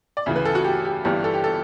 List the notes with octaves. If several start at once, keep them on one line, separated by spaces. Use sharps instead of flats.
D5
D2 C#3 E3 E5
B4
A4
F#4
G4
G4
G1 G2 E3 G4
A4
G4
A4